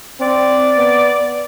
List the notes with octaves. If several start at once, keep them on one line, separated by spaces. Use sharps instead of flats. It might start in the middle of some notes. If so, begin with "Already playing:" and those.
C4 D5
B3